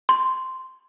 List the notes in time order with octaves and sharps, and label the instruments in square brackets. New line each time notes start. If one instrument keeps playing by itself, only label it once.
[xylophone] C6